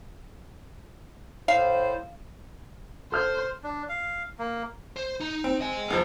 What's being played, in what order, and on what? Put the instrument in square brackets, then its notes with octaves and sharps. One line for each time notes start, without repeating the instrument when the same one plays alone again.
[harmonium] A2 C5 [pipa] F5
[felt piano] A4 F6 G6 [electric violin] C5
[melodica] D4
F5
A#3
[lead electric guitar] C5
D#4 A#5
[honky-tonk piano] C4
[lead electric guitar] D#5 G#5
[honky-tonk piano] F1 E2 F3